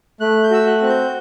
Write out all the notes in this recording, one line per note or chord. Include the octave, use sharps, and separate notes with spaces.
A3 F#6
G6
F#4 E6
F#6
C4 F#6
G6